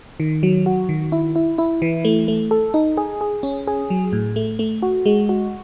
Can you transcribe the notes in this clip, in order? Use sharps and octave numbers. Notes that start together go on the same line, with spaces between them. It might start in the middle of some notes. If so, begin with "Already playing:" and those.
D#3
F#3
F#4
D#3
E4
E4
E4
E3
A3
A3
A4
D#4
G#4
G#4
C#4
G#4
F#3
A2
A3
A3
F#4
G#3
F#4